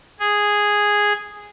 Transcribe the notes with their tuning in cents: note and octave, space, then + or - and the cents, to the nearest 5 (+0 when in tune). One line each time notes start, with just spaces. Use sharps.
G#4 -5